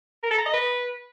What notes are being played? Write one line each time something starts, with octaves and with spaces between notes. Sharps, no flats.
A#4
A4
A#5
D#5
B4